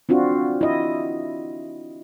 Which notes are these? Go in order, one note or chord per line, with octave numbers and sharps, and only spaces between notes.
C4 D4 F4 F#4
E4 D#5